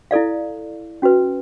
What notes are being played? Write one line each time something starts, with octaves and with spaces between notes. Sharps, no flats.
E4 A4 D5 F5
C#4 F#4 B4